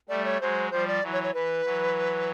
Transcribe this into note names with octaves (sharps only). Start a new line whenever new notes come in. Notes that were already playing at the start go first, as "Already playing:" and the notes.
G3 A3 D5
C#5
F#3 G#3 C5
F3 G3 C5
D5
E3 F#3
C#5
C#5
E3 B4
E3 F#3